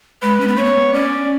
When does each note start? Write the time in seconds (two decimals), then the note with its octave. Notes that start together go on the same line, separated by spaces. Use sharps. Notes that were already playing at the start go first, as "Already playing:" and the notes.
0.22 G#3 B4
0.40 C#4
0.48 B3
0.56 A3 C#5
0.64 B3
0.93 C#4 D5